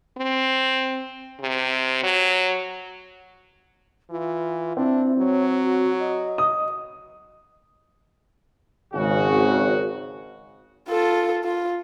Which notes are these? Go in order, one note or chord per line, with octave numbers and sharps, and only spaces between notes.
C4
C3
F#3
E3 F4
C4 D4 E4
F#3 C#5
F#4
D#5
D#6
G#1 C#3 F#4
F4 A4
F4